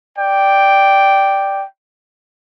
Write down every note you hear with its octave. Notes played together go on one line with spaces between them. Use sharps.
D5 G5